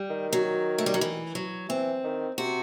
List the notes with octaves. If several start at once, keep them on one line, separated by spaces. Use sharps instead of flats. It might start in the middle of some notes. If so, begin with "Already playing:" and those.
Already playing: G3
D#3
F#3
A3
G3
F#3
E3
F#3
E3 C4
D#3
C3 F#4